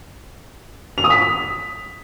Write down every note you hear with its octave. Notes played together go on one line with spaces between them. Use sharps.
F7
D#6
B6